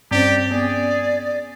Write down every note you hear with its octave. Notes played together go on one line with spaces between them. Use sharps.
G2 C4 C#4 G4 C5 D5
B3 G#4 D5